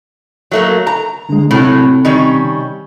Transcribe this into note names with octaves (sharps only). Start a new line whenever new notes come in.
F#3 A3 A#3
A#5
D3 G#3
A2 C3 F#3
D#3 G3 C#4